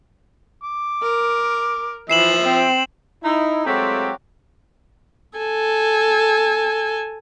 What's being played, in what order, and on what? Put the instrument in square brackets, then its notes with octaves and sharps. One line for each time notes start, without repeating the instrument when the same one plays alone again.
[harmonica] D6
[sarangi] A#4
[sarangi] E3 [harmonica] F3 E5 [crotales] C7 E7 F#7
[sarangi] C4
[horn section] D#4 E4
F#3 G#3 A3 C4 F4 G4
[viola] A4 G#5